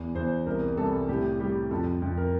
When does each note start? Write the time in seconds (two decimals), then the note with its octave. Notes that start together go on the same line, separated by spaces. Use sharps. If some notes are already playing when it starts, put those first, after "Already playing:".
Already playing: E2
0.15 E2 C5
0.46 C2 A#4
0.77 C2 A4
1.09 A2 G4
1.40 G3 G4
1.71 F2 A4
2.02 F2
2.17 A#4